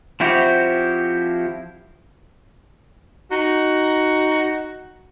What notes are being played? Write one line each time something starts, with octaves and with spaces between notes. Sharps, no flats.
F3 C4 E4 F#4 G4
D#4 F#4